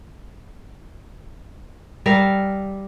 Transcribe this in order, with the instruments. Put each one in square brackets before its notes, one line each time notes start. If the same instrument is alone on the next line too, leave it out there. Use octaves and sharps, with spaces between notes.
[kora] G3 A#4 E5 F5